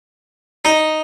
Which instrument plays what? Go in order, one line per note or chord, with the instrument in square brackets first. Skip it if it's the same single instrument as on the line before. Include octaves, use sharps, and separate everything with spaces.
[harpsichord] D#4